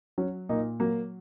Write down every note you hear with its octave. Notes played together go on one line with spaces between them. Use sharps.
F#3 C#4
A#2 A#3 D#4
F#3 A#3